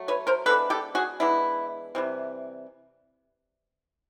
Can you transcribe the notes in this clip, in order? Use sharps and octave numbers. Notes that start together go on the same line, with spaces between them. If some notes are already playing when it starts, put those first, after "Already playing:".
Already playing: F#3 A3
B4 C#5
A#4 C5
E3 G#3 B3 D4 A4 B4
G4 A4
F#4 G#4
E3 G#3 B3 D4 E4
C3 E3 G3